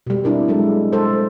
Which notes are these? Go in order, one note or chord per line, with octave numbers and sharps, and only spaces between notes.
B2 G3
C4 D4 E4 A#4
F#3 G#3 A4
A4 C5